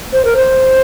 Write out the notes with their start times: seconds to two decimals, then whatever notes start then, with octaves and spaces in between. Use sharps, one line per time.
0.13 C5
0.25 A#4
0.37 C5